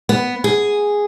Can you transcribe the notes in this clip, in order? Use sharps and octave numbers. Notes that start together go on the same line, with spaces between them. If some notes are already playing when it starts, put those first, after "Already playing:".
B3
G#4